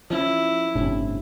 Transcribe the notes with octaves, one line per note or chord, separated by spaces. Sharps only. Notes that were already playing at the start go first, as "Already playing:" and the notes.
F3 C#4 E4
G1 A2 C3 C#4 D4